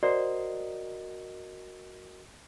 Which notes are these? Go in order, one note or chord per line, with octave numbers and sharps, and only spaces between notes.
F#4 A#4 C5 D5 D#5